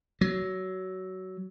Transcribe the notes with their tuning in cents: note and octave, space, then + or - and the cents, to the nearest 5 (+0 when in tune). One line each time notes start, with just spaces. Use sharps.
F#3 +15